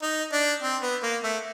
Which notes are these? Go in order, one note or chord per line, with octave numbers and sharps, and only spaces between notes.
D#4
D4
C4
B3
A#3
A3